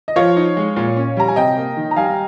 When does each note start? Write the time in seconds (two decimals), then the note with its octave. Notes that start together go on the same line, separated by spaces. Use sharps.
0.08 D#5
0.16 F3 C#5 F5
0.37 D#4
0.57 G#3
0.76 A#2
0.97 C#4
1.17 G3 A#5
1.28 G#5
1.36 C3 D#5 G5
1.57 A#3
1.77 D#3
1.91 A#5
1.96 G3 F5 G#5